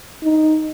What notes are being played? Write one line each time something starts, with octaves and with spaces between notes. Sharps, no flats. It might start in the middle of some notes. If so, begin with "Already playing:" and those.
D#4